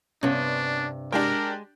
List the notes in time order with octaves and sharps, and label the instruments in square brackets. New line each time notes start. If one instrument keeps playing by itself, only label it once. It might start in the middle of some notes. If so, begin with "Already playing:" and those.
[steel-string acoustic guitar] G2 C3 [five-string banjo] B3 C#4 [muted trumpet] D4
[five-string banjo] G#3 [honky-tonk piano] D4 G4 G5 [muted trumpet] A#4